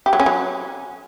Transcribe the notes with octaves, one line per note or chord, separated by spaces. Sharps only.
G4
F#3
C#4
F#3